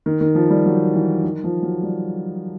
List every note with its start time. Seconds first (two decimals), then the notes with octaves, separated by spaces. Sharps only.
0.06 D#3
0.21 D#3
0.35 F3
0.50 G3
0.66 F#3
0.94 E3
1.24 D#3
1.44 F3
1.63 F#3
1.83 G3